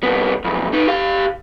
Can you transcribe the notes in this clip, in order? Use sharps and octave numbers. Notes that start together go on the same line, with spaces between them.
C2 B3
B1 F2
D#4 B4
G4 F5